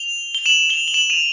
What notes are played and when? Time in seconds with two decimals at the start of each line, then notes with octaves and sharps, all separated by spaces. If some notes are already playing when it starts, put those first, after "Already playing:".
Already playing: F7 G7
0.35 G7
0.46 E7 F#7
0.70 F7 G7
0.88 G7
0.94 E7 F#7
1.10 D#7 F7